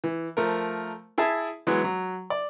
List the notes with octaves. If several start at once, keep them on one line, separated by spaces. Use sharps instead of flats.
E3
F3 A3 A#4
E4 G#4 E5 A5
E3 F#3 G#3 B3
F#3
D5